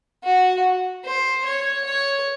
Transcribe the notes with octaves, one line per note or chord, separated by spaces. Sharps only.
F#4
C5
C#5
C#5